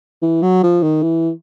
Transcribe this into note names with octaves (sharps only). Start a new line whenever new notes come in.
E3
F#3
F3
D#3
E3